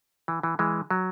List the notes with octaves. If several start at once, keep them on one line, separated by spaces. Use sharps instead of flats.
E3
E3
E3 G#3
F#3